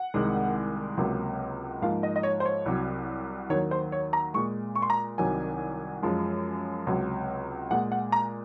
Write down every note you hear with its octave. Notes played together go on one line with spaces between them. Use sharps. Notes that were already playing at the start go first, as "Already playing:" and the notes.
Already playing: F#5
C2 C3 D#3 G#3
C#2 C3 F#3 A#3
G#2 F3 A#3 F5
D#5
D#5
C#5
C5
C#5
C2 C3 F#3
D#2 D#3 F#3 C#5
C5
C#5
A#5
A#2 G#3 C#6
C#6
C6
A#5
C2 C3 D#3 F#3 G#5
F#2 F3 G#3
C#2 C3 F#3
A#2 G#3 F#5
F#5
A#5